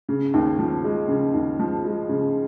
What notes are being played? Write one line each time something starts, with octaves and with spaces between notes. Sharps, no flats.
C#3
D#2
F3
G#3
C#3
D#2
F3
G#3
C#3